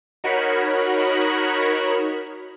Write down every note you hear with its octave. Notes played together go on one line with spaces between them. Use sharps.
D#4 F#4 A#4 C#5 B5